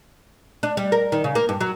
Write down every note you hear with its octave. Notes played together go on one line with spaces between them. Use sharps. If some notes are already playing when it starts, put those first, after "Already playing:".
D4
G3
A#4
D#3
C#3
A#3
G2
F#3